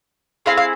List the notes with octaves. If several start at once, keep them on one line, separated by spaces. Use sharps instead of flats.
C4 E4 G#4 F5
F5